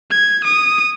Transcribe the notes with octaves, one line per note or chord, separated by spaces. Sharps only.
G#6
D#6